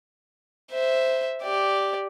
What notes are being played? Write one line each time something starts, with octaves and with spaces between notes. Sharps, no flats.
C5 E5
G4 D5